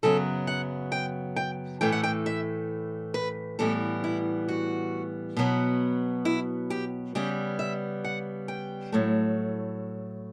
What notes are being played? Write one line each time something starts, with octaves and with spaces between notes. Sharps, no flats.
F#2 C#3 F#3 B3 A4
F#5
G5
G5
A2 E3 A3 G5
F#5
G5
E5
B4
A2 E3 G3 B3 A4
E4
F#4
B2 F#3 B3
E4
G4
C#3 G3 B3 G4
E5
F#5
G5
A2 F#3 A3